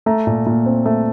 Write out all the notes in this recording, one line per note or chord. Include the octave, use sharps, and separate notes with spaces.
A3 A#5
A#2
A#2
C4
A3